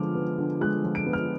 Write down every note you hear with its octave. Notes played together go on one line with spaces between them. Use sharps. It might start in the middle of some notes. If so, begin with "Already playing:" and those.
Already playing: D3 F3 G#3 B3 D6 F6
B3
D3
G#3 F#6
F3
D7
B3
F6